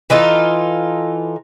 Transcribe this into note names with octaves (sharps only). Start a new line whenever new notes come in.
E3 D#4 F4 A4